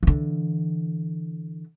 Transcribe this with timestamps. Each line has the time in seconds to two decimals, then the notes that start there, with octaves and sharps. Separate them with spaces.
0.03 D3 E3